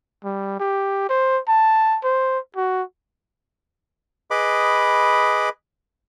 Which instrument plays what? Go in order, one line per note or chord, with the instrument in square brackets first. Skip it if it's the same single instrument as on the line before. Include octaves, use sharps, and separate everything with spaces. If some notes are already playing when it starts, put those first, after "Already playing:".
[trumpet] G3
G4
C5
A5
C5
F#4
[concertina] G#4 B4 D#5 B5 D6